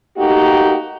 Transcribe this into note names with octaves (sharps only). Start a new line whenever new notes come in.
A3 A#3 D#4 F#4 G4